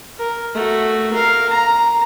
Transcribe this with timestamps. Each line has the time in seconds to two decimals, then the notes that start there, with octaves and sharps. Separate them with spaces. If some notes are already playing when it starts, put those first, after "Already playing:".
0.18 A#4
0.55 A3 F#4
1.13 A#4 F5
1.50 A#5